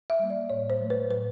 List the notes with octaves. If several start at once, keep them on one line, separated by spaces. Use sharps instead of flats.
E5
G3 A#3
D5
A2 C#5
C5
F#3 A3
B4
A2 B4